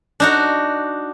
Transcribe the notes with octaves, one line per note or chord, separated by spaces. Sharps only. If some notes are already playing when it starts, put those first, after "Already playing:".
D4 D#4 F#4